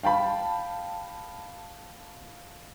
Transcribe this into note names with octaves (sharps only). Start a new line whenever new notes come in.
F5 G5 A5 B5